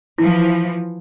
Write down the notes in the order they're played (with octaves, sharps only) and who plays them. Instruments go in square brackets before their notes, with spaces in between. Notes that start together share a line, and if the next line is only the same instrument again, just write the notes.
[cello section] E3 F3 [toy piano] E4